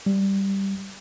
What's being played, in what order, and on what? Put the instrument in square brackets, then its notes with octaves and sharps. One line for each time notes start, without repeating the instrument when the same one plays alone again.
[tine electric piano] G3